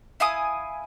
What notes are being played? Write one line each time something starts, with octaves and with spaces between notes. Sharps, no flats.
E4 F5 G#5 D#6